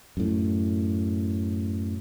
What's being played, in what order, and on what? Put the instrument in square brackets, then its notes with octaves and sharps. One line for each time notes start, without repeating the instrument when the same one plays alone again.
[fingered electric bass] F#2 A2